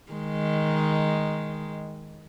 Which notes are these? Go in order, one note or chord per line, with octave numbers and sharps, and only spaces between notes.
D#3 G#3